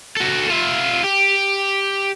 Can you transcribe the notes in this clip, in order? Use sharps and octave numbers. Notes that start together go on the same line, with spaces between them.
F#4 A4
F4 E5
G4